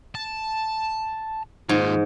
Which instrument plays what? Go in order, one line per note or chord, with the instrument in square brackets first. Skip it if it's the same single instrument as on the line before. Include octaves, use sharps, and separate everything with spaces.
[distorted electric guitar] A5
[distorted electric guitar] D#2 F4 [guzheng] G#2